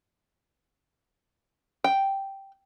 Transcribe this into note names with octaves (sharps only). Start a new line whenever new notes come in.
G5